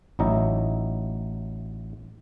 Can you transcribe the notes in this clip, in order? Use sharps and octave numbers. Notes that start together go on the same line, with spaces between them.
A1 F#3 D#4 E4 A#5